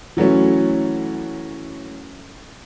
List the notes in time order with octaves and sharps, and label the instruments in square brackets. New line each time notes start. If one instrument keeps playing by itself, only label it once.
[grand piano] E3 F#3 A3 C#4